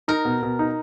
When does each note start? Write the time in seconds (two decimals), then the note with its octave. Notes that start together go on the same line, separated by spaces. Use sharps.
0.08 D#4 A#4
0.25 B2
0.42 B2
0.59 D#4